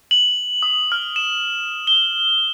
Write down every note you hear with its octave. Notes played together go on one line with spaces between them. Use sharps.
F#7
D#6
F6
E7
G7